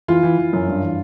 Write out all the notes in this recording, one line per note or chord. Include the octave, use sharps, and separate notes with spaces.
E3 F4
E3
E3
F#2
G2
E3